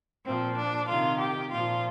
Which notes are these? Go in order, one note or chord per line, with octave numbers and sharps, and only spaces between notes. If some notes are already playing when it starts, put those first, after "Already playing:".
A#2 F3 C4
D4
C3 D#3 F4
G4
A#2 F3 F4